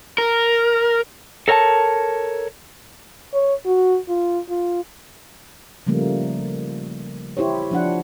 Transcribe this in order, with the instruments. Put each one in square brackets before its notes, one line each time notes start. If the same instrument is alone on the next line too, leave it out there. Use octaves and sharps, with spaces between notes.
[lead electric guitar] A#4
[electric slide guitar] A4 A#4 C#5 G5 A5
[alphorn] C#5
F#4
F4
F4
[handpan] C#3 F3 G3 A3 A#3
E4 G4 C5 C#5
F3 D4 F#5